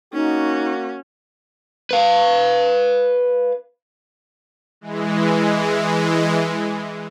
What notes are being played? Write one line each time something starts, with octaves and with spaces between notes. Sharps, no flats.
A#3 C#4 D#4 F#4
B4 F5
E3 G#3